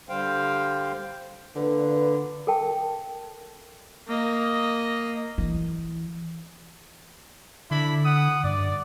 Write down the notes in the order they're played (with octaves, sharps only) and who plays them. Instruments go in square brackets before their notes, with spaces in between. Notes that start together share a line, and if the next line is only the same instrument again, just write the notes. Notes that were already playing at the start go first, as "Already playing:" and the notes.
[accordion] D3 G3 C5 F5 G5
[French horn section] A#2 B4 [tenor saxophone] D3
[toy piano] A4 A#4 G5 A5
[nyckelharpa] A#3 D#5
[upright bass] E3
[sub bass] D3 [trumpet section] D4 E4 B5
[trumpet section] F#5 D#6
[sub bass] G2 [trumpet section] D5